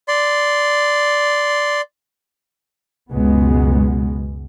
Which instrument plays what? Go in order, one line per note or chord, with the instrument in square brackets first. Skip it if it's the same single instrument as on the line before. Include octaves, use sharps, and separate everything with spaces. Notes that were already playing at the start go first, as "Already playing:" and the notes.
[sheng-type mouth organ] D5 C6
[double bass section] C#2 F#2 B2 G#3 B3